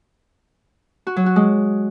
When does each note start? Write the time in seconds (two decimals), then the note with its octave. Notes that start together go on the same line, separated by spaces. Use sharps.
1.07 F#4
1.16 F#3
1.26 F#4
1.36 G#3